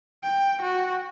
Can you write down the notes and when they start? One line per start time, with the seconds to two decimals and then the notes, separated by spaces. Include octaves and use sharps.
0.23 G5
0.61 F#4